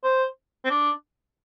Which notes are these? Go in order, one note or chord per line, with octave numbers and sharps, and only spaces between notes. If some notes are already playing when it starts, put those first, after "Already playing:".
C5
C4
D4